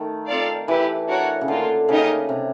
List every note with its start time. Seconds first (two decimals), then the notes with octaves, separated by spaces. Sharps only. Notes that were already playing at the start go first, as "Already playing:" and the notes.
Already playing: D#3 A3
0.27 C4 F4 A4 D5 F5
0.67 E3 E4 G4 B4
1.08 D4 F#4 A#4 C#5 F#5
1.41 C#3
1.48 D3 A#3 D4 F4
1.88 C#3 A#3 D#4 G4 A#4 D#5
2.29 C3